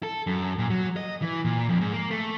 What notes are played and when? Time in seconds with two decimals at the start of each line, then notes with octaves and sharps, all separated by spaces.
0.03 A4
0.27 F#2
0.59 A#2
0.70 F#3
0.96 D#5
1.22 E3
1.45 A#2
1.69 F2
1.81 G#2
1.92 A#3
2.11 A3